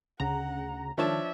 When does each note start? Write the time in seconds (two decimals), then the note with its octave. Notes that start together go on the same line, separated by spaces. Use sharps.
0.20 D2 C#3 F#5 A#5
0.98 D#3 F3 D4 C#5 E5 A5